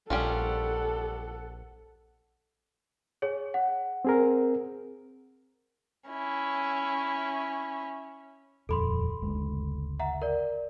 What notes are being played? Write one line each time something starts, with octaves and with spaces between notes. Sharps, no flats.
A#1 G3 C#4 F4 A4 F#5
G#4 C#5
F#5
C4 G#4 A#4
C#4 E4
D#1 F2 A4 B5 C6
F#1 D2 G#3
E5 F#5 A#5
A#4 D5